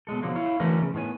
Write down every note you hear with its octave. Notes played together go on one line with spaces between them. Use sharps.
B2 F#3 G#3 A4
B2 D3 F3 F#3 A#3
E4 C#5 F5
D3 E3 A3 C#4 F#4 A#4
C#3
A2 D#3 B3 C#5 G#5